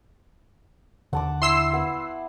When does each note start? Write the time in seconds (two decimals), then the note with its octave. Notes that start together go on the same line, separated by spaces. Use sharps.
1.13 D#2 D3 F#5 A5 D6
1.42 E4 C6 E6 C7
1.73 B3